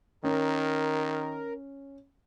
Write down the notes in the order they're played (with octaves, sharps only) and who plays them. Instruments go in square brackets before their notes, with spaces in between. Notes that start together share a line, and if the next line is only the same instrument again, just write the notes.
[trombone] D#3 [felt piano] C#4 [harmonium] A#4